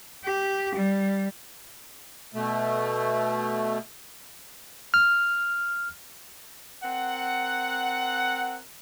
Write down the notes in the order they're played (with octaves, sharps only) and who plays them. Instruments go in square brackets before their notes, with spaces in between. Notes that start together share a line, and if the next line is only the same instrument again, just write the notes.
[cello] G4
G3
[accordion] B2 A3
[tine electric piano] F6
[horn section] C4 A#4 F#5